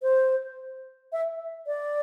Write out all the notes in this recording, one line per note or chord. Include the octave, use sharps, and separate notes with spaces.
C5
E5
D5